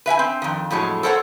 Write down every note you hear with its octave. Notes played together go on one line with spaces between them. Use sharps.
B4 E5 G5 G#5
C4
F2 D#3
F2 A2 F#3 G#3
A4 A#4 C5 C#5 F#5